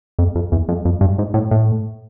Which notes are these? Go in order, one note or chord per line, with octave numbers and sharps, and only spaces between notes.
F2
F2
E2
F2
F2
G2
G#2
A2
A2